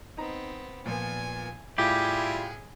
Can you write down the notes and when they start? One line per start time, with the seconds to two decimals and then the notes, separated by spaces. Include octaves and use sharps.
0.17 B3 C4 D#4 A#5
0.86 A#2 F3 B3 G#5
1.78 A2 G3 E4 F4 G4 G#4